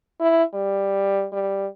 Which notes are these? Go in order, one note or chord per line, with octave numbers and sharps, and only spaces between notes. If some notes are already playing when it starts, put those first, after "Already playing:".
E4
G3
G3